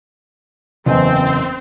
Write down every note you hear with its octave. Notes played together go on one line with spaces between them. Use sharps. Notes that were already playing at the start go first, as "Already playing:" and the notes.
F#1 E2 C4 D#5